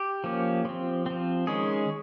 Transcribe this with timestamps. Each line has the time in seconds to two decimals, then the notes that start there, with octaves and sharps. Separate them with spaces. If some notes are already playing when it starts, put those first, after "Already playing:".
Already playing: G4
0.24 F3 A#3 C#4
0.65 F3 C4
1.06 F3 C4
1.47 D#3 G#3 C#4 G#4